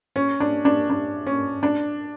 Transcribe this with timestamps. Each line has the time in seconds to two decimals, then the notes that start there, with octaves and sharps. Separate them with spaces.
0.16 C#4
0.40 D4
0.65 D4
0.90 D4
1.27 C#4
1.63 D4